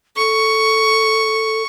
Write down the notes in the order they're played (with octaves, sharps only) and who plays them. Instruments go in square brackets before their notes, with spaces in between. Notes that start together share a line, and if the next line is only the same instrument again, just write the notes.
[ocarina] A4 [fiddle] C#6